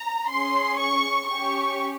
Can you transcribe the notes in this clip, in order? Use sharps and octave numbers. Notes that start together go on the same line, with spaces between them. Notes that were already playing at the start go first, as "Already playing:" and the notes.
Already playing: A#5
C#4 G#4 C6
C#6
C#4 G4 C#6